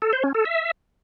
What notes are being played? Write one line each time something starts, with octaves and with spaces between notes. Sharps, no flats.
A4
C5
C#4
A4
E5